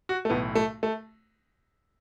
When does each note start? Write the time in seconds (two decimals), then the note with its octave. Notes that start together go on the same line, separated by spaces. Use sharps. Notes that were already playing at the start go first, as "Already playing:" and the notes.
0.09 F#4
0.25 A3
0.30 B1 A2 E3 B3
0.55 A3
0.83 A3